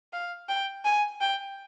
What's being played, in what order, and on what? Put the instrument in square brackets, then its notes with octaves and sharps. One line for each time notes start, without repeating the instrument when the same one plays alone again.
[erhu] F5
G5
G#5
G5